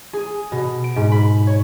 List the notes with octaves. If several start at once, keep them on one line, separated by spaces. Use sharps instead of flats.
G#4
B2
D7
G#2
B5
C#5